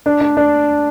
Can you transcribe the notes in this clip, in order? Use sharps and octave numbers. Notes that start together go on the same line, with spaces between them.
D4
D4
D4